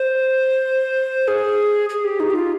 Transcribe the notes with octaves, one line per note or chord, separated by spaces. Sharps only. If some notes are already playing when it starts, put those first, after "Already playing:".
Already playing: C5
G#4
G#4
G4
D#4
G4
F4